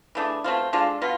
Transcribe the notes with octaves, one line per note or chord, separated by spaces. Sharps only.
E3 A3 D4 G#4
B2 A3 C4 F4
G#3 D4 F4 A4
B2 B3 F4